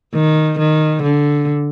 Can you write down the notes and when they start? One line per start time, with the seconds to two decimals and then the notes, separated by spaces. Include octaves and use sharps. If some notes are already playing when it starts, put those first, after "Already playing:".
0.14 D#3
0.59 D#3
1.02 D3